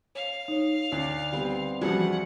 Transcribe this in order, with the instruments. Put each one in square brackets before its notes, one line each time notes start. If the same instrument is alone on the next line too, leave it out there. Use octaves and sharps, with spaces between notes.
[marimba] C#5 [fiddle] F5
[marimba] D#4 C#5
[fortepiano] D2 [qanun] D5
[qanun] G3 B3 C4
[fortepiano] E2 G2 F3 [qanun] G3 F#4 G#4 [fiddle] F#5